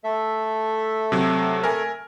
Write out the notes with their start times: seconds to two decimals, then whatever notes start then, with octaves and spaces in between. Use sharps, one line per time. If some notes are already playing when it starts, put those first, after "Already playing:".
0.04 A3 A4 E5
1.12 C3 F#3
1.64 A#4 G#5